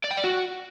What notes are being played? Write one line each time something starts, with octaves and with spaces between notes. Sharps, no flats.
D5
G5
D5
F#4